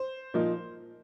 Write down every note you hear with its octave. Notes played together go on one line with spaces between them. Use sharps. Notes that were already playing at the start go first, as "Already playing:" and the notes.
Already playing: C5
A#2 F3 A#3 D#4